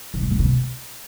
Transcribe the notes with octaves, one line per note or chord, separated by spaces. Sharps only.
C3
B2
A2
B2